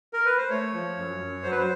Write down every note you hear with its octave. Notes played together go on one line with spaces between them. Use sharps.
A#4
B4
C5
A3 C#5
F3
F#2
F#2
F#3 C5
B4
C5